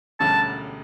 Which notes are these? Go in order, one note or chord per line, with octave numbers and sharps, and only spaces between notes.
E1 D2 D3 G3 C#4 A5